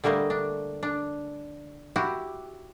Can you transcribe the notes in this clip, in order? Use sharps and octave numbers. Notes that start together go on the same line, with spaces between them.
D3 G3 A3 A#3 D#5
D4
D4
E4 F#4 G4